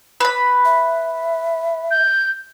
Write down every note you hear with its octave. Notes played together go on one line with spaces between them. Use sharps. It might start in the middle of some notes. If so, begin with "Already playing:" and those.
B4 B5
E5
G6